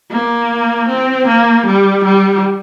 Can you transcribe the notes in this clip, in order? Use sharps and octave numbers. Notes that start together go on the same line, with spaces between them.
A#3
C4
A#3
G3
G3